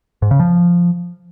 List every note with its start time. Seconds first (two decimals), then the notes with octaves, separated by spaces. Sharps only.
0.22 G#2
0.31 C#3
0.40 F3